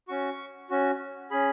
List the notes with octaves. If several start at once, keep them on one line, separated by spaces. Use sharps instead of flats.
C#4 F#4 C#6
C#4 F#4
C#4 G#4 B5